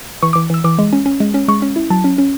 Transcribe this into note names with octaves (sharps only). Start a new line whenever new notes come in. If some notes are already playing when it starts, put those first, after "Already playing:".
E3 C#6
E3 D6
E3 E6
E3 D6
G#3
C#4
C#4
G#3
C#4
G#3 C#6
C#4
E4
F#3 A5
C#4
C#4